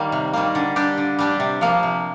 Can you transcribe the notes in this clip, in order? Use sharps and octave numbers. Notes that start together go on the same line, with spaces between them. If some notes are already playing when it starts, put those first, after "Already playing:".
Already playing: D#3 G3 A#3
C3
D#3 G3 A#3
D3
G3 D4 G4
D3
G3 D4 G4
C3
F3 A#3
C3